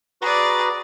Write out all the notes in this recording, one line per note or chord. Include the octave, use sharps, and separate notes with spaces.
F#4 G#4 B4 D5 A#5